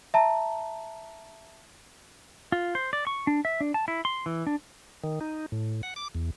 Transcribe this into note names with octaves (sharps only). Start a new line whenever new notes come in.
E5 A5 A#5
F4
C5
D5
C#6
D4
E5
D4
A5
E4
C6
E3
D4
D#3
D#4
A2
F#5
D6
E2